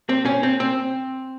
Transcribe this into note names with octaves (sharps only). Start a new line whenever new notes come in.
C4
C#4
C4
C4